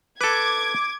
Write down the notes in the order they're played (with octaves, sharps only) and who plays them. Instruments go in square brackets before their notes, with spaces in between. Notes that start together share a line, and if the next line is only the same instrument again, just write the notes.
[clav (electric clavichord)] A4 B4 [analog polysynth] D6 [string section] G#6